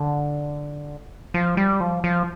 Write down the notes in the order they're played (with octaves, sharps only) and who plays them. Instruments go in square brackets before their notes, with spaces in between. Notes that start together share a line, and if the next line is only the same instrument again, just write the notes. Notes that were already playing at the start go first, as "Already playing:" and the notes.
Already playing: [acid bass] D3
F3
G3
F3
F3